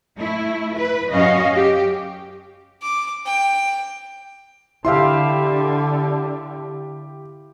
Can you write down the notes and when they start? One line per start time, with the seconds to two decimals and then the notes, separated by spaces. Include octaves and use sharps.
0.19 A3 E4
0.78 B4
1.11 F#2 C#4 F#4 D#5 F5
1.55 G4
2.83 D6
3.26 G5
4.85 D3 E4 G4 E5 F5 C6